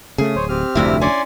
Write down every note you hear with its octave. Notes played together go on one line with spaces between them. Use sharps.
C#3 A3 G#4
D1 C5 C#5
C4 G4 F6
F1 D2 G2 C3 D4 E4
C#4 D5 G#5 C6